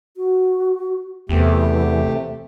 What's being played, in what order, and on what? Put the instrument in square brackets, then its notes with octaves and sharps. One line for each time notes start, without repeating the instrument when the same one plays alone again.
[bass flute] F#4
[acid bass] E2 [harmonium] C3 A3 G4 [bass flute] E3